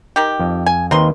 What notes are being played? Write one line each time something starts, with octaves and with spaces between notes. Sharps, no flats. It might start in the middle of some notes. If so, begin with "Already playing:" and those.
D#3 G4
F2
G#5
D#2 D#3 C4 D#4 B4 C6